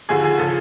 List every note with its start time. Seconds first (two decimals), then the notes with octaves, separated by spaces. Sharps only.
0.09 D#2 D3 F3 G#4
0.24 G#4
0.39 C#3 F3 A4